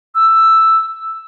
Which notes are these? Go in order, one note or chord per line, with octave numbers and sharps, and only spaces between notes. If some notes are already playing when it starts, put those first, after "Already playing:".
E6